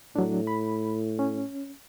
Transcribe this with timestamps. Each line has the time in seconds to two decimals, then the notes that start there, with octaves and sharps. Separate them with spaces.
0.16 A2 F#3 D4
0.47 B5
1.19 C#4